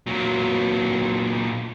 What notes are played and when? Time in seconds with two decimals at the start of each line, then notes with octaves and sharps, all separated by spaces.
0.07 A#2 F#3